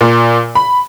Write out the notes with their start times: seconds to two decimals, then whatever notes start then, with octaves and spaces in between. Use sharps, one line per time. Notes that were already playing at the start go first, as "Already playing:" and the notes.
0.01 A#2
0.55 B5